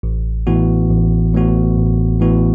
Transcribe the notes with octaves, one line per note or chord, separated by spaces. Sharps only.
A1
A2 E3 B3 F#4
A1
A2 E3 B3 F#4
A1
A2 E3 B3 F#4